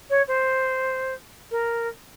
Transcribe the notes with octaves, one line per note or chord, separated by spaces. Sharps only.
C#5
C5
A#4